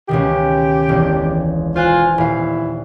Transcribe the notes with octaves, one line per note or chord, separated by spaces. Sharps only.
C#2 B2 D#3 G4
E1
F4 C5 G#5 F#6
D#1 E4 F5